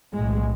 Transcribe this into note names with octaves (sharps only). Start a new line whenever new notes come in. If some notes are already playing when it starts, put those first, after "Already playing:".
B1 A2 G#3